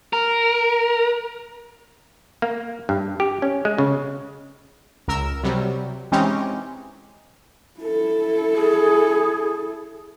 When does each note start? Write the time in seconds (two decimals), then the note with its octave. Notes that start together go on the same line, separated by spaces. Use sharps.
0.13 A#4
2.42 A#3
2.89 G2
3.20 G4
3.42 C#4
3.65 G#3
3.78 C#3
5.08 C#2 A#4 E6
5.43 C3 F#3 G3
6.12 E3 G#3 C4 C#4 D#4 G4
7.80 E4 A4
8.55 G#4